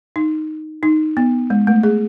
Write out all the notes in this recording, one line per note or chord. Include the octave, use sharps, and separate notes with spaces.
D#4
D#4
B3
G#3
A3
G#4